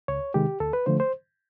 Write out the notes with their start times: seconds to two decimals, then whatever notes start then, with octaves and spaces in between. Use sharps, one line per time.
0.08 C#2 C#5
0.34 C3 D#3 G#3 G4
0.60 D2 A4
0.73 B4
0.86 D3 F3 A3 C5
1.00 C5